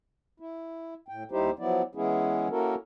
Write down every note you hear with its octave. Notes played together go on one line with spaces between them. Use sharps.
E4
A2 G5
D#2 G3 D#4 E4 G4 C5
F3 F#3 B3 E4 D5
E3 G#3 B3 C#4 E4 G#4
A#3 C#4 E4 F#4 A4 A#4